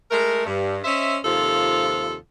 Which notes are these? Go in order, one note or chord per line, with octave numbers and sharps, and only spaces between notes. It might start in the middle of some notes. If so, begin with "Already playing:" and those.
G#3 A3 A#4
G2
C#4 C5 D#5 E5
D#2 C3 F3 F4 A4